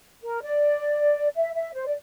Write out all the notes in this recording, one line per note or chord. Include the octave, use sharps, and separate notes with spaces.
A#4
D5
E5
E5
C5
D5